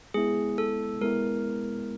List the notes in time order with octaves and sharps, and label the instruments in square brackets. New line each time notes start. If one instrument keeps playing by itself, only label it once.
[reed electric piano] G#3 B3 E4 [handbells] G#4
[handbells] A4
[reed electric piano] G#3 B3 E4 [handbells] A#4